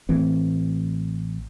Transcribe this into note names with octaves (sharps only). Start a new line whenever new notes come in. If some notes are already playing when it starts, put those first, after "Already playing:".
A1 E3 A3 C4